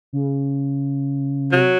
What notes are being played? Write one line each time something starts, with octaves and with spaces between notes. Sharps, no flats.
C#3
C3 F#3